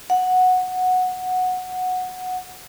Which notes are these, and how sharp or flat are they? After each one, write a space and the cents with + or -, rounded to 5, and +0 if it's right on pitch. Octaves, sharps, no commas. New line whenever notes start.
F#5 -10